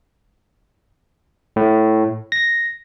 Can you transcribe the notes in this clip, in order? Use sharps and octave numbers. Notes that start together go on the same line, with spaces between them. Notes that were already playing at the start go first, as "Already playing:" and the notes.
A2
A#6